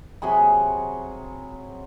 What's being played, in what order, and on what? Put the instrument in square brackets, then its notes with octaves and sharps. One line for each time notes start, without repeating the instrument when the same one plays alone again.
[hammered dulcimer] C3 F#3 G#4 B5